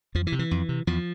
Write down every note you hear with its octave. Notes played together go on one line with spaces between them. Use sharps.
F2 F3
E3
C3
E3
F2
C3
E2 F3